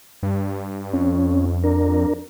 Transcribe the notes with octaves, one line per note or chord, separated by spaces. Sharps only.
G2
F2 C#4
D4 A#4